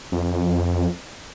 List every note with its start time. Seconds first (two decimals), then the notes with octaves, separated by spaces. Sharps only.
0.12 F2